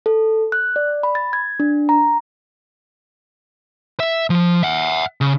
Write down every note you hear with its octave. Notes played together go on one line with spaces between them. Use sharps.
A4
F#6
D5
B5
A6
G#6
D4
A#5
E5
F3
E5 F#5
C#3